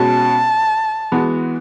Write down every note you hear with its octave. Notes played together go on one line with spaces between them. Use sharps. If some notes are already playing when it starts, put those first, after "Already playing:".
Already playing: B2 G#3 C#4 F#4 A5
E3 G#3 B3 F#4